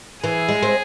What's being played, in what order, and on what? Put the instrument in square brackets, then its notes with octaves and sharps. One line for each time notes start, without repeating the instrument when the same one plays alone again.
[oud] E3 [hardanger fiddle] G#4
[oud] G#3
C4